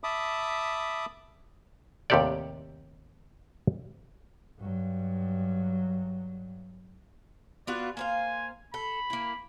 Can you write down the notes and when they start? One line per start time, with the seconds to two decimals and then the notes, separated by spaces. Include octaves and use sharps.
0.04 E5 A5 B5 D6 D#6
2.10 D#2 A2 C3 G4 A4 D5
4.60 G2 F#3
7.67 B3 F4 F#4 D5
7.97 A#3 C5 F5 G#5
8.74 A4 B5
9.10 A#3 E4